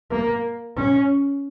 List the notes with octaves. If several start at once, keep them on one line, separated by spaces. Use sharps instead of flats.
A#3
C#4